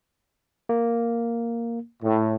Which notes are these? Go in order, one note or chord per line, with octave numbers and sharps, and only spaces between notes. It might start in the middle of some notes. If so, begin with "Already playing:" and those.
A#3
A2